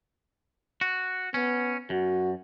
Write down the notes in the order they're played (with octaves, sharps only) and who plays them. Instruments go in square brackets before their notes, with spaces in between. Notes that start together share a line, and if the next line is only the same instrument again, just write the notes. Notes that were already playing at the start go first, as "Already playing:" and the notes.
[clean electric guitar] F#4
[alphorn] B3 [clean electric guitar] C#4
[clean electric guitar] F#2 [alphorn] F#4